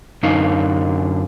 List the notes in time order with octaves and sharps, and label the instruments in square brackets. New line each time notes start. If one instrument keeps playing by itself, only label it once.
[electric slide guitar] F#2 D3 D#4 F5